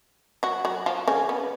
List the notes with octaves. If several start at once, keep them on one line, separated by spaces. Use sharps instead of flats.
F#3 F#4
F#3 F#4
F3 F4
C#3 C#4
B3